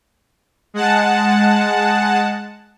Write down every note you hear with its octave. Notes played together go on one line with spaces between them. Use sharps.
G#3 F#5 A5